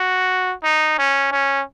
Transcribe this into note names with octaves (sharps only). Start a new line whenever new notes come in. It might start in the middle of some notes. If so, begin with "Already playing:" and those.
Already playing: F#4
D#4
C#4
C#4